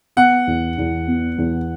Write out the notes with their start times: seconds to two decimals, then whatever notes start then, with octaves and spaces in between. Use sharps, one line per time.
0.17 B3 F#5
0.47 E2
0.78 E2
1.07 B3
1.38 E2